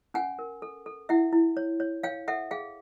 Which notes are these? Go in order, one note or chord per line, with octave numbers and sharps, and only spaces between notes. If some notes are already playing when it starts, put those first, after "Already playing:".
C#4 F#5 G#5
A#4
A4
A4
E4 E5 F#5
E4
C#5
C#5
C#5 F5 G5
A4 E5 F#5
G#4 F5 G5